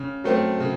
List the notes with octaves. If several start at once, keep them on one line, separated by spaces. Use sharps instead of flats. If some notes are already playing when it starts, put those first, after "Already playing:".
Already playing: C#3 F6
F#3 A3 C4
C#3